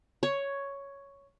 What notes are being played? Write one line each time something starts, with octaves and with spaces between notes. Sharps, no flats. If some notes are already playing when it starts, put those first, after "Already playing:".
C#5